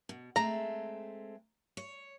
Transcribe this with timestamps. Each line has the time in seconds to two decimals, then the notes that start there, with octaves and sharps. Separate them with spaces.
0.09 B2
0.36 G#3 A3 C4 A#5
1.77 C#5